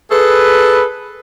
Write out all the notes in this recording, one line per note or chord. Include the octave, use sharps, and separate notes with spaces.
G#4 A4 B4